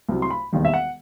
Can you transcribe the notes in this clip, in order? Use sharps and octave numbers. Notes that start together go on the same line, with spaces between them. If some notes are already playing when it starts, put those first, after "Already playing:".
C2 C3 F#3
C6
B5
E1 D#2 D#3 G3
E5
F#5